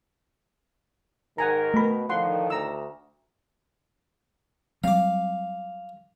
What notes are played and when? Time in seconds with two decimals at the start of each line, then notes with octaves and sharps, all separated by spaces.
1.38 G#2 D#3 A#4 F#5 G#5 A#5
1.74 B2 A3 B5
2.09 A2 D3 D#3 F3 F#5 C6
2.50 D2 A#5 E6
4.84 F#3 G3 C4 F5 D6